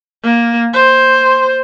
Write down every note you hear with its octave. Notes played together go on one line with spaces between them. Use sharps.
A#3
C5